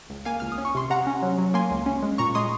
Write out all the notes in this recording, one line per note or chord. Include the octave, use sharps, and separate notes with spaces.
C#2
A#3 F5 G#5
C#2 F6
D#6
C#4
C#6
C3 C6
C3 F#5 A#5
C#4
F#3
F#3
A#3 G#5 C6
C#2
C#4
G#3
A#2 A#5 C#6
G#3 C6 D#6